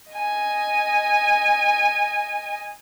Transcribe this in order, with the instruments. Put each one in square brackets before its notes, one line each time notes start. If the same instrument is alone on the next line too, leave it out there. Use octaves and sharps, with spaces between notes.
[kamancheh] D#5 G#5